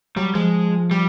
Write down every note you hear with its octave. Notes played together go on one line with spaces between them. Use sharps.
F#3 G3
F3 G#3
G3